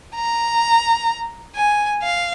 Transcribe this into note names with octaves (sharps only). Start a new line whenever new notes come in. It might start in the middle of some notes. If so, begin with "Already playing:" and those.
A#5
G#5
F5